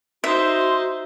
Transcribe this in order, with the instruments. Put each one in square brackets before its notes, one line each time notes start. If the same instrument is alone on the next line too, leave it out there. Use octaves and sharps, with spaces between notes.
[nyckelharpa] D#4 C5 [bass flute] F#4 [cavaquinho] E5 [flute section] C6